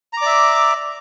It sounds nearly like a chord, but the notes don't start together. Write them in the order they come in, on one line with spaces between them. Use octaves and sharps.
A#5 D6 D5 E5